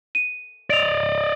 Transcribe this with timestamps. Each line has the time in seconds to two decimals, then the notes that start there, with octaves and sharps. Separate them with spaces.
0.15 D#7
0.70 D5 D#5 D7 F7